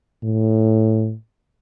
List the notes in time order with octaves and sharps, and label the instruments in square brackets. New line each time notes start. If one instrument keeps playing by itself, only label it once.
[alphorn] A2